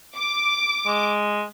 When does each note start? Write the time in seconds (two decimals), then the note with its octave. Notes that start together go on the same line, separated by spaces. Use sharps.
0.15 D6
0.86 G#3